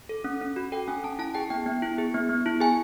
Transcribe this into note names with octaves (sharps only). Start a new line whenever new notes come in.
A4
C#4
C#4
F#4
A4 G5
C#4 G#5
C#4 A5
E4 A5
G#4 G5
B3 G5
B3
E4
G#4
B3
B3
E4
G#4 G#5